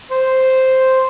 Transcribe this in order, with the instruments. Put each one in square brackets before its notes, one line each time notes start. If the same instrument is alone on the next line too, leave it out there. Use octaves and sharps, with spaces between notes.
[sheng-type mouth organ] C5